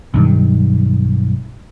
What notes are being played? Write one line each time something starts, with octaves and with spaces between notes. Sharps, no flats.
B1 G2 D#3